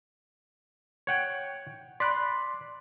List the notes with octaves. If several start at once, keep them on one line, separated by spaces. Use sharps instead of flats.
C#5 F#5 G5
D5 B5 C6 F#6 B6